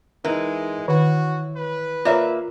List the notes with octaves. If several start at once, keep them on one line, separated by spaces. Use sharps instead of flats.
E3 G#3 D#4 A#4
D#3 F#4 C#5
B4
A#3 F4 A#4 C#5 D5 E5